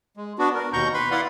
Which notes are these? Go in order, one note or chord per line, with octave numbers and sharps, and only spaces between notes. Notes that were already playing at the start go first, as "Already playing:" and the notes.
G#3
B3 D4 F#4
A#4
D#2 B2 A#5 C#6 G6
B4 B5 C6
E4 D5 F5 F#5 B5 C6